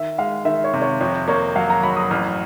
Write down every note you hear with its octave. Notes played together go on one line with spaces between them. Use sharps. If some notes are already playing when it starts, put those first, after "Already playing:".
Already playing: D#3 E5
G#3 F5
D#3 E5
C#5
C3
C#5
F2 C#5
A#3 C#5
F#3 F5
A#5
F#3 B5
D#6
A1 F6